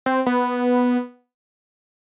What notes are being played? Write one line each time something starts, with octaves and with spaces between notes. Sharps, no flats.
C4
B3